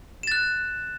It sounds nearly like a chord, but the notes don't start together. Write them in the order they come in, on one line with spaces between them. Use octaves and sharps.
E7 A6 F#6